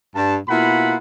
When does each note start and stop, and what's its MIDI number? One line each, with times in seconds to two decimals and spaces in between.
0.15 0.35 43
0.15 0.35 81
0.48 0.94 47
0.48 0.94 58
0.48 0.94 64
0.48 0.94 65
0.48 0.94 78
0.48 0.94 83